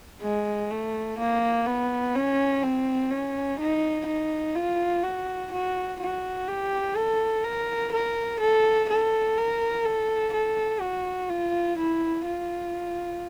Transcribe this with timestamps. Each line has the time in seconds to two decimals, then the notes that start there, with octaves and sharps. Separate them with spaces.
0.22 G#3
0.71 A3
1.18 A#3
1.66 B3
2.15 C#4
2.63 C4
3.11 C#4
3.60 D#4
4.07 D#4
4.55 F4
5.04 F#4
5.52 F#4
6.00 F#4
6.48 G4
6.96 A4
7.44 A#4
7.93 A#4
8.40 A4
8.90 A4
9.38 A#4
9.85 A4
10.34 A4
10.81 F#4
11.30 F4
11.78 E4
12.26 F4